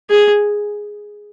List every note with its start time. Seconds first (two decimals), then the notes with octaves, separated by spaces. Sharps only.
0.10 G#4